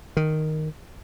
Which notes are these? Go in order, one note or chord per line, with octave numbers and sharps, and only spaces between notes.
D#3